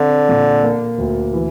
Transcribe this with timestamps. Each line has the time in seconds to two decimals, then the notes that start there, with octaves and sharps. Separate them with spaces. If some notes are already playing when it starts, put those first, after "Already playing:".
Already playing: D3 C4
0.29 A#2
0.64 A#3
0.98 D2
1.33 E3